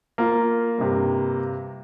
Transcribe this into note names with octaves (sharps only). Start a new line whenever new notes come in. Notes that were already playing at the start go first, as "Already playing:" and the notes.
A#3 F4
G2 C3